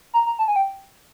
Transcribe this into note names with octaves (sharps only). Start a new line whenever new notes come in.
A#5
A#5
A5
G#5
G5